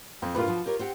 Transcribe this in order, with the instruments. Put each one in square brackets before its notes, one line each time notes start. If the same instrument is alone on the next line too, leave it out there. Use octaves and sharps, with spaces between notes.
[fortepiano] F2 [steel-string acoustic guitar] C4
[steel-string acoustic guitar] G2 A#2 G3 [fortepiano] F4 B4
[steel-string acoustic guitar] B2 F3 F#4
G4 A#4 C#5
C4 G4 F#5